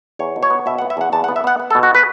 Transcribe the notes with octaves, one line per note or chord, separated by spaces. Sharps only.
E2 C#5
B2
C#5
B3
B2 E5
F#5
B3
E5
E2 F#5
E2 A5
F#5
B3
E5
B3 F#5
B3
A4
B2
F#4
B4